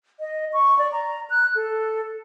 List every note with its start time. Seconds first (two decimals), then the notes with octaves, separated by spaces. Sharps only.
0.20 D#5
0.53 C#6
0.79 D5
0.92 A#5
1.30 F#6
1.56 A4